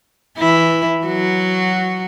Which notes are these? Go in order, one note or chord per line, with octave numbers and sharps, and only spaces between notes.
E3 E4
F#3 F#4